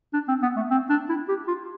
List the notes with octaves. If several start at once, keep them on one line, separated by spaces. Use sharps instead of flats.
D4
C4
B3
A3
C4
D4
E4
G4
F4